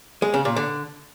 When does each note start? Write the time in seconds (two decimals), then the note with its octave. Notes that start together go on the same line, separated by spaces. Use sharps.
0.22 G#3
0.34 C#3
0.45 A#2
0.56 D3